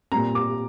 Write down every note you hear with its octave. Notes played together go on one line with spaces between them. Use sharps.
A#2 G3 C4 A#5
D6